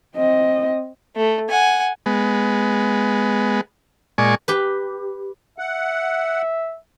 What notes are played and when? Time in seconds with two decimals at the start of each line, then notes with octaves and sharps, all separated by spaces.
0.16 C4 D#5
1.16 A3
1.50 F#5 G#5
2.06 G#3 B3
4.18 A#2 G#3 D5 G#5 C#6
4.48 G4 B4
5.58 E5 F#5